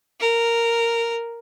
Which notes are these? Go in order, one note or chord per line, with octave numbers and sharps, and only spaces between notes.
A#4